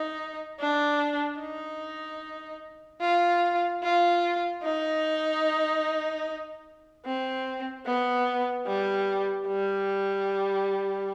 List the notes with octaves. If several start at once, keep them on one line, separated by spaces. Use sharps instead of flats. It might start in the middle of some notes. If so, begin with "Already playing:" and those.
Already playing: D#4
D4
D#4
F4
F4
D#4
C4
B3
G3
G3